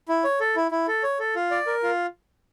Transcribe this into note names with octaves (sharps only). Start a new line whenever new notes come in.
E4
C#5
A4
E4
E4
A4
C#5
A4
F4
D5
A#4
F4